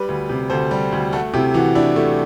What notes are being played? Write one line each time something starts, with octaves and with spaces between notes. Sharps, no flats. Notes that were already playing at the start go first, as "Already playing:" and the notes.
Already playing: G3 G4 B4
D2
C3
D2 A4 C5
G3
D2
A3 F#4 A4
C3 E4 G4
E3 F#4
D4 E4
A3 F#4